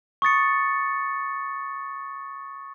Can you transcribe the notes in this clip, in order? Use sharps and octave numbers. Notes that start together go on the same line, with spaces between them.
C#6 D#6 A6 C#7